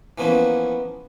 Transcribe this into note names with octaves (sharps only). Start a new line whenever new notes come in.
E3 F3 A#3 B3 C#4